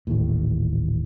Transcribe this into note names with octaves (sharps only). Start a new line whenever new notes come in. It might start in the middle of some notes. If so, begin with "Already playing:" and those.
D#1 A1 D#2 A2